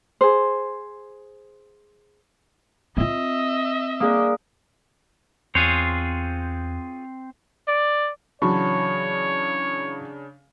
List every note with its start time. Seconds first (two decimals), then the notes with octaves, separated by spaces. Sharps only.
0.21 G#4 C5
2.97 C4 F4 D#5 E5
4.00 A#3 D4 G#4 F5 D#6
5.55 E2 C4 F4 G#4 C5 C#5 F#6
7.68 D5
8.42 C#3 E3 F#3 D4 C#5 A5 B5 C#6